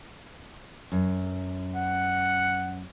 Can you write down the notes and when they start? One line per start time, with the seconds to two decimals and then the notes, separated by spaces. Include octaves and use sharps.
0.92 F#2
1.76 F#5